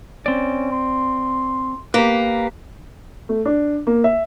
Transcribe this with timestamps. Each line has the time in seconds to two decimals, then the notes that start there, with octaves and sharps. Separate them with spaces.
0.26 C4 C#4 D5
0.72 C6
1.94 A#3 G4 B4
3.29 A3
3.46 D4
3.87 A#3
4.04 E5